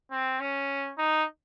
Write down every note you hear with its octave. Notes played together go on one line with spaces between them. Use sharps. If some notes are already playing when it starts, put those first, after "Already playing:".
C4
C#4
D#4